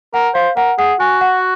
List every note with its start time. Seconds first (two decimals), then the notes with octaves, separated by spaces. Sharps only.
0.14 A#4 F#5
0.35 C5 F5
0.57 A#4 F#5
0.78 G#4 F#5
1.00 F#4 G#5
1.21 F#5